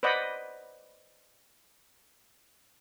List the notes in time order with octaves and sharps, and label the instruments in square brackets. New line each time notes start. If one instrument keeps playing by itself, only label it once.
[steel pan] B4 C5 D5 D#5 F#5 B5